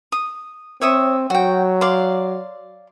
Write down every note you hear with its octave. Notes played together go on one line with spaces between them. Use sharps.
D#6
C4 C#5 E5 D#6
F#3 F#4 G5
D5 F5 C6